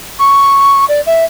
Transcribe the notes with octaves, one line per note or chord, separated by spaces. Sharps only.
C#6
D5
E5